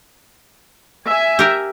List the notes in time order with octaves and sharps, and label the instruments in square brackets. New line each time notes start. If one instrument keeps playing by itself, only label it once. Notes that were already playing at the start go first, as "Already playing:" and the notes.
[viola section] E5 G#5
[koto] G4 A#4